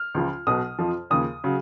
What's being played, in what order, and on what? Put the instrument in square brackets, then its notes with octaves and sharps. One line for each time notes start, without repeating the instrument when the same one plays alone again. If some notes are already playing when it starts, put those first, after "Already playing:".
Already playing: [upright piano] F6
C#2 C#3 F3
B1 B2 F#3 D#6
F2 F3
D#2 C#3 F3 D#6
C#3 F#3